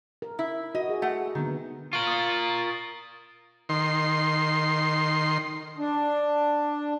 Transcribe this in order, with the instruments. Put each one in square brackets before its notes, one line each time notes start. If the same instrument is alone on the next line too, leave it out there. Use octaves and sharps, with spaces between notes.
[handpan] A#4
[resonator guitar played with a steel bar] E4
[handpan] F#4 [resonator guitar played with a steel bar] D#5
[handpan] G#4
[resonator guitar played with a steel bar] A3 F#5
[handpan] D3 A#3 B3 [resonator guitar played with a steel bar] D#3
[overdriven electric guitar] F4 A#4 [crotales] C#6 F#7
[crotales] D#6 A6
[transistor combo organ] D#3 C6
[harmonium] D4